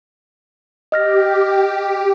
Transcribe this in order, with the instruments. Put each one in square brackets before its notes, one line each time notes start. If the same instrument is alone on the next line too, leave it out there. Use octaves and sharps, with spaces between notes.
[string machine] G4 [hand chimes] D#5 F6 A#6